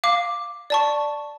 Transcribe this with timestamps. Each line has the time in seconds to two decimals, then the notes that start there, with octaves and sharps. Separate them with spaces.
0.04 F5 D6
0.70 D5 A5 C#6